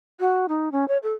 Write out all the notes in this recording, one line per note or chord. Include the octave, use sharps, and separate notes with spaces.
F#4
D#4
C#4
C#5
A4